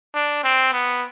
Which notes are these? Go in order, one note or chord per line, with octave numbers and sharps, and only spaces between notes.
D4
C4
B3